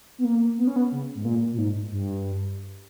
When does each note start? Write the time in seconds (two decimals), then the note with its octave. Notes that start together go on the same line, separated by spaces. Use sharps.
0.18 B3
0.25 A#3
0.58 B3
0.67 C#4
0.76 B3
0.92 C#3
1.15 G#2
1.25 A#2
1.52 A#2
1.58 G#2
1.92 G2